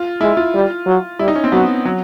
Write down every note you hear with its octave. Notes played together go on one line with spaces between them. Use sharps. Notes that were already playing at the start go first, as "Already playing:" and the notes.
Already playing: F4
G#3 E4
F4
G3
F#3
G3 E4
D#4
C#4
C4
F#3 B3
F#3